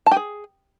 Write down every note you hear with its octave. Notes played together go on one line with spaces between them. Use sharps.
A5
G4
G#4